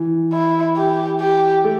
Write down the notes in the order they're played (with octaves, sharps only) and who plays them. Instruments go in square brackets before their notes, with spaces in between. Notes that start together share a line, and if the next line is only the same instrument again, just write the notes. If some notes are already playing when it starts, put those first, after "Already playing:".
Already playing: [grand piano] E3
[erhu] E4
G4
G4
[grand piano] A3